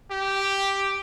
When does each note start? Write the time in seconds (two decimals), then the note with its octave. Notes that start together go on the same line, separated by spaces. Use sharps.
0.11 G4